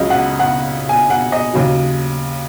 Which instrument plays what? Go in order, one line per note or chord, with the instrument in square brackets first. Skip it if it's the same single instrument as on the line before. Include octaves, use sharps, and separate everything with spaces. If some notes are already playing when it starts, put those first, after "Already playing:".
Already playing: [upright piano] C#2 C#3 F#3 D#5
F#5
F#5
G#5
F#5
D#5
D#2 C#3 F#3